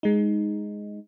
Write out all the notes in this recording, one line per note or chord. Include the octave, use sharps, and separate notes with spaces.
G#3 D#4